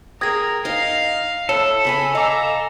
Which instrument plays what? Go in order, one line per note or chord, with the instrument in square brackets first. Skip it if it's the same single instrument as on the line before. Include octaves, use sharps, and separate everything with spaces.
[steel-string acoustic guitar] G#4 G5 [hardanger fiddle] A#4 [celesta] D#6 G#6 A#6
[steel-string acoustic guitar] D#4 D#5 [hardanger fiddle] F5
[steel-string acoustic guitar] E4 [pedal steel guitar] A4 [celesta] C#5
[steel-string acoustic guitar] C#3 C#4 G#5 [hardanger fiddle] B5
[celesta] D#5 D6 [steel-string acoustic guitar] F5 [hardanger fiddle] G#5 A#5